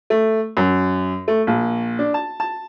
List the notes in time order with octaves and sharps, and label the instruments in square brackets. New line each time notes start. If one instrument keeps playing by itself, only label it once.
[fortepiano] A3
F#2
A3
A#1
D4
A5
A5